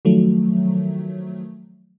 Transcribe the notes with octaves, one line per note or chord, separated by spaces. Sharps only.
D#3 F3 F#3 A3